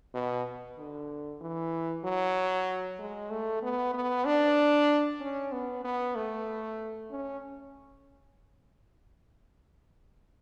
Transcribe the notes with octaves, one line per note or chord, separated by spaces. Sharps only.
B2
D3
E3
F#3
G#3
A3
B3
B3
D4
C#4
B3
B3
A3
C#4